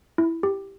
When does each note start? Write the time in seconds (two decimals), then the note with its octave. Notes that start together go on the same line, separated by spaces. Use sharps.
0.18 E4
0.43 G4